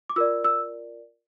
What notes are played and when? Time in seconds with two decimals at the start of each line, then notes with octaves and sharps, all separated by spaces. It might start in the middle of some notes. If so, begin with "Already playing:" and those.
0.09 D6
0.16 F4 A#4 D5 E6
0.44 E6